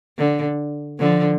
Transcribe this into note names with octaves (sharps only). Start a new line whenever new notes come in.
D3
D3 F3